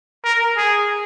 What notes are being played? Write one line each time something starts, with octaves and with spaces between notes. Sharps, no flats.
A#4
G#4